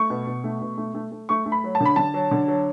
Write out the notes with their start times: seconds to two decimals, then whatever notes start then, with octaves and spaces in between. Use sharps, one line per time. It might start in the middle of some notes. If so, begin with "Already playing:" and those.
Already playing: A3 C#6
0.10 B2
0.27 B2
0.44 A3
0.61 B2
0.78 A3
0.95 A3
1.12 A3
1.29 A3 C#6
1.46 A3
1.52 B5
1.64 F#3
1.75 A5
1.80 D3
1.86 B5
1.96 D3 A5
2.14 F#3
2.31 D3
2.48 F#3